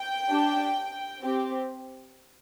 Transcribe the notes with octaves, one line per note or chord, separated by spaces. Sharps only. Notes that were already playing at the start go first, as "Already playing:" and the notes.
Already playing: G5
D4 G4
C4 G4